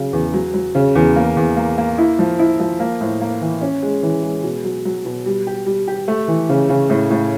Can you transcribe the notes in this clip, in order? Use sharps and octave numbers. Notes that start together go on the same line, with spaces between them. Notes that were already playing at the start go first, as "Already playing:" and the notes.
Already playing: C#3 F#3
E2
F#3
F#3
C#3
E2
A#3
E2
A#3
A#3
E4
F3
E4
F3
A#3
A2
A#3
E3
C#4
G#3
E3
G#3
B2
F#3
F#3
B2
G3
G4
G3
G4
A3
E3
C#3
C#3
A2
A2